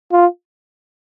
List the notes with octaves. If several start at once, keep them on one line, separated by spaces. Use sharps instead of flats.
F4